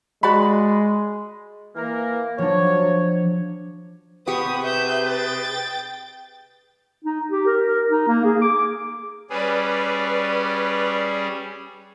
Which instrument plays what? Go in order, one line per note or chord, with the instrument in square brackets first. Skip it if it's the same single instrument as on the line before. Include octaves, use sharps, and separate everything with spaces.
[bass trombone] G#3 [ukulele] F#4 D5 B5
[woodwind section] E3 A#3 A#4
[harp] F3 D4 [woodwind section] F#3 C#5
[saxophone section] C3 G#4 B4 [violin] B3 D#6 [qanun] G4 C#6
[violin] E5 G6
G5 A6
[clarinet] D#4
G4
A#4
A#4
D#4
A#3
G#4
D6
[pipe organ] G3 C#4 G#4 [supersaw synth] B4 D5